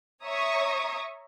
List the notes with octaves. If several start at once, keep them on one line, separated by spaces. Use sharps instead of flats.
C#5 E5 A#5 C#6 D#6